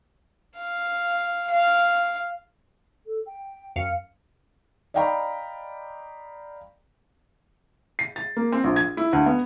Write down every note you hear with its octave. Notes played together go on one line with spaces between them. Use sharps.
F5
F5
A4
G5
F#2 F5 C#7
D5 D#5 F5 G5 A#5 B5
C7
A6
A#3
C4
A#1
G#6
E4
D2
B3